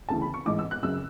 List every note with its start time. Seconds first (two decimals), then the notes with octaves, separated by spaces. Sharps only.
0.09 D2 C#3 E3 A5
0.22 B5
0.34 C#6
0.46 A1 G#2 E3 D6
0.59 E6
0.71 F#6
0.83 F#2 C#3 E6